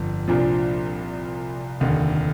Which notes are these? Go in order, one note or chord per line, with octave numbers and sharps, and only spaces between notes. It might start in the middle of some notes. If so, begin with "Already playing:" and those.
Already playing: G1 F2
C2 A#2 F3 D4
F1 D#2 D3